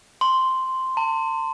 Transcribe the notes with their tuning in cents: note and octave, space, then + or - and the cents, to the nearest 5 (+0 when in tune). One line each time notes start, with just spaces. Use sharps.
C6 -5
A5 +40